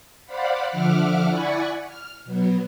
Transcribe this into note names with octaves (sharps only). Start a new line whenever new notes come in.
C5 D5 F5 F#5 B5
D3 F3 E5 F#5 D6 F6
E4 D5 F#5 G#5 B5 C#6
F6
B2 F#3 B3